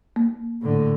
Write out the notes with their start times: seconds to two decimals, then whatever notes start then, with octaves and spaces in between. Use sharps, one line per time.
0.16 A#3
0.62 A2 D3